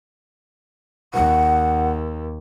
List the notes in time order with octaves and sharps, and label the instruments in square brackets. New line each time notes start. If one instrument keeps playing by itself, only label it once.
[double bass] D#2 [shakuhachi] F#5